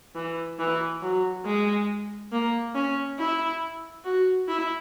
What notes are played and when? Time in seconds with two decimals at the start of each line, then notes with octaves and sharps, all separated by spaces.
0.15 E3
0.59 E3
1.02 F#3
1.45 G#3
2.32 A#3
2.75 C#4
3.19 E4
4.05 F#4
4.48 E4